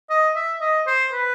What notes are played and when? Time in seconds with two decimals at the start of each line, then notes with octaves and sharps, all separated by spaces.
0.10 D#5
0.35 E5
0.61 D#5
0.87 C5
1.13 B4